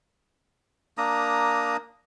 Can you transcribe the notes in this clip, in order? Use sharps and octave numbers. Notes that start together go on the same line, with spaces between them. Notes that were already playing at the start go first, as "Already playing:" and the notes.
A#3 D4 A#5 D#6